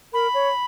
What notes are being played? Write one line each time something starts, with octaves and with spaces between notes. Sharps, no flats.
A#4 B5
C#5